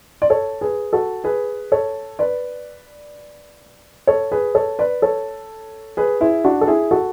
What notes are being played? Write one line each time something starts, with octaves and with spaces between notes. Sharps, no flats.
D5
A4 C#5
G#4 B4
F#4 A4
G#4 B4
A4 C#5
B4 D5
A4 C#5
G#4 B4
A4 C#5
B4 D5
A4 C#5
G#4 B4
E4 G#4
D4 F#4
A4
E4 G#4
F#4 A4